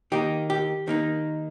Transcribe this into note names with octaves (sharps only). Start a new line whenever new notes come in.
D#3 A#3 D#4 G4
G4
D#3 A#3 D#4